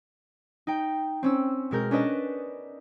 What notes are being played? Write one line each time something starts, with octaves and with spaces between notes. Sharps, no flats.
D#4 G5
C4 C#4 E6
B2 G#3 A#4 G6
C#4 D4 B4 D#5 A5